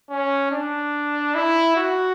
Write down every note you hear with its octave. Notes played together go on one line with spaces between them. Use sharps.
C#4
D4
E4
F#4